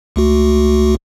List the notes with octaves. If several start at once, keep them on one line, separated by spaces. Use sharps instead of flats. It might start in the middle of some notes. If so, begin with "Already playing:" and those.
C#2 A3 F#4